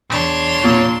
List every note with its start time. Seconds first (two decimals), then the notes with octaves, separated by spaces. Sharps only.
0.10 B1 E2 D4 C#5 C6
0.64 A#2